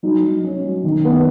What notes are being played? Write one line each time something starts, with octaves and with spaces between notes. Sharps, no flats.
F#3 D#4
F#3
C#4
F#3
D#3
B3